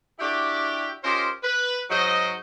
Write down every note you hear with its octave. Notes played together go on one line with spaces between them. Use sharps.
D4 E4 F#4 G4
C#4 F4 G4 A#4 C5 D#5
B4
G#2 F#3 F#4 C5 D#5